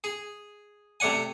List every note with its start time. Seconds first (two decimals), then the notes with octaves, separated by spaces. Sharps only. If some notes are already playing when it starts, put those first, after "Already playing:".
0.04 G#4
1.00 C3 A3 D5 F#5 G#5